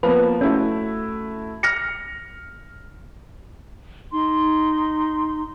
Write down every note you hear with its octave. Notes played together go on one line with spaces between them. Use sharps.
F3 A#3 B3 B4
A3 C#4 E4 F#4
F6 A#6 C#7
D#4 C6